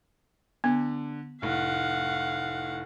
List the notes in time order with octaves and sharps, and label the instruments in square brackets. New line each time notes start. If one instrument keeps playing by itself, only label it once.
[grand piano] D3 [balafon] B3
[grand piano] F1 A2 [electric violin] F5 F#5